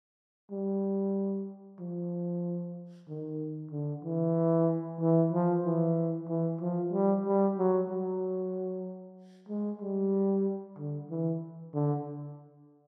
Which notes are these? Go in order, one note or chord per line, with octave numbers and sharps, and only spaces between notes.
G3
F3
D#3
D3
E3
E3
F3
E3
E3
F3
G3
G3
F#3
F#3
G#3
G3
D3
E3
D3